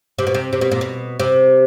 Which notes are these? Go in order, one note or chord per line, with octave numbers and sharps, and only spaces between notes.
C3
B2
C3
C3
B2
A#2
B2
C3